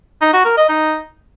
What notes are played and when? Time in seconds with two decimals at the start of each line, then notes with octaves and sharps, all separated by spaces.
0.21 D#4
0.33 F#4
0.45 A#4
0.57 D#5
0.69 D#4